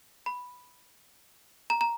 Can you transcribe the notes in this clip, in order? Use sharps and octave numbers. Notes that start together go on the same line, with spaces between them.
B5
A#5
A#5